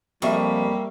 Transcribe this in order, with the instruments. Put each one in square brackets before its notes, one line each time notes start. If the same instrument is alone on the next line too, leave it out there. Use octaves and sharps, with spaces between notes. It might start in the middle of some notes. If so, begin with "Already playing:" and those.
[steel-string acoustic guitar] F2 [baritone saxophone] G3 [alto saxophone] A#3 [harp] E5 C#6